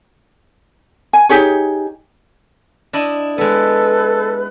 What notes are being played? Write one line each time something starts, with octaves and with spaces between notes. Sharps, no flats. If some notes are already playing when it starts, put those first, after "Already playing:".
G#5
D#4 G4 G#4 C#5
D4 E4 D#5
G#3 B3 A4 B4